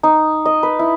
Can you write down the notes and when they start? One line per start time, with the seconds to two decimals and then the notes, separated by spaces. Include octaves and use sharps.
0.03 D#4
0.45 D#5
0.63 B4
0.79 E4